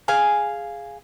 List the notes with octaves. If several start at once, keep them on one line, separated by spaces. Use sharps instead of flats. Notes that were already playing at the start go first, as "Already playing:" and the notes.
G#4 F5 G#5